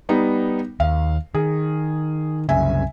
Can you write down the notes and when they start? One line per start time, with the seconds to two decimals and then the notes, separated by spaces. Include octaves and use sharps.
0.09 G3 B3 D#4
0.80 D#2 F5
1.35 D#3 G#4
2.49 C2 F#2 C#3 E5 G#5